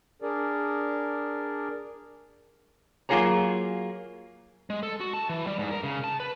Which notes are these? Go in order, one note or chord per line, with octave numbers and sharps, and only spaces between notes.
D4 G#4 A#4 D5
F#3 A#3 F4 G#4 C#5 A#5
G#3
A4
F#4
A5
E3
G3
G#2
A#4
C#3
A5
B4